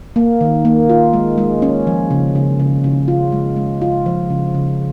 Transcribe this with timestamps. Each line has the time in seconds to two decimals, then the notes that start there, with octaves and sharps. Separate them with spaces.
0.16 A#3
0.41 D#3
0.65 A#3
0.90 F4
1.13 G#3
1.38 G#3
1.62 C#4
1.87 F3
2.11 C#3
2.35 C#3
2.60 C#3
2.84 C#3
3.08 F4
3.32 G#3
3.57 G#3
3.82 F4
4.06 F3
4.30 C#3
4.55 C#3